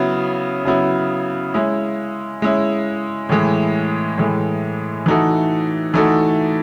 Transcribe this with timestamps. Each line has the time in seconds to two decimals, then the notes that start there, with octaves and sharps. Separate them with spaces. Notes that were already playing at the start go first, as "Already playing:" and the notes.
Already playing: C#3 F#3 B3 E4
0.65 C#3 F#3 B3 E4
1.54 G#3 C#4 E4
2.42 G#3 C#4 E4
3.29 A2 E3 G#3
4.18 A2 E3 G#3
5.06 E3 A3 D#4 F#4 A4
5.94 E3 A3 D#4 F#4 A4